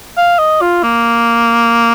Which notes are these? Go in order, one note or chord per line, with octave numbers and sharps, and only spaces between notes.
F5
D#5
F4
A#3